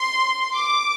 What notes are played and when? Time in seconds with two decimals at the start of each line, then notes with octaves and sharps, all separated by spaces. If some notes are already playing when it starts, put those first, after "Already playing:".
Already playing: C6
0.55 D6